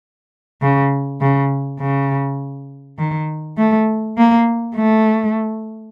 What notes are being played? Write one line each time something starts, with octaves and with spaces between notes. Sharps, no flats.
C#3
C#3
C#3
D#3
A3
A#3
A3